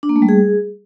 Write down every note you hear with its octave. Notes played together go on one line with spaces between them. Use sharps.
D4
A#3
A3
G3
G#4